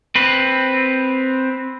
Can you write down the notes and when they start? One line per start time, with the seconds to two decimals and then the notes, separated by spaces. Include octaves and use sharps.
0.15 C4 B4